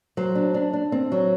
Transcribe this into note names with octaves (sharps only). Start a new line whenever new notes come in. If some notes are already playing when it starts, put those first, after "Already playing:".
F#3 C5
D4
D4
D4
C4
F#3